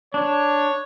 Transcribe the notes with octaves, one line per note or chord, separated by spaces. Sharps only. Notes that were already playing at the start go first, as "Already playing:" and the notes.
D4 C#5